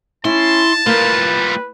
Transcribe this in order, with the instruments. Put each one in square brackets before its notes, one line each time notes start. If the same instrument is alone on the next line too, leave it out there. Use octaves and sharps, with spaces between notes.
[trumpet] C#4 [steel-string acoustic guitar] E4 [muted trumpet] A5 [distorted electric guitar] C6
[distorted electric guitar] G3 F4 [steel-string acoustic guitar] A#3 [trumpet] B4